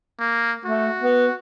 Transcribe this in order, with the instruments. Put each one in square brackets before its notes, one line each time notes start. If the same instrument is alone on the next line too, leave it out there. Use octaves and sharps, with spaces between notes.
[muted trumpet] A#3
[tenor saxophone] A3 [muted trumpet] F#4
[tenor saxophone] B3